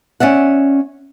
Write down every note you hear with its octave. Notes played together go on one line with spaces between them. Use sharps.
C#4 D5 E5 F#5